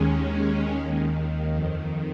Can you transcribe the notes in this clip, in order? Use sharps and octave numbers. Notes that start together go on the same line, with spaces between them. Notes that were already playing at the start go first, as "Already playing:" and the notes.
Already playing: D#2 D#3 G#3 C#4
D#2 D#3
F2 D#3